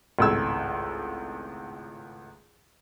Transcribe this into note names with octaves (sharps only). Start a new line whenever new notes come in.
G#1 C#2 A2 E6 G#6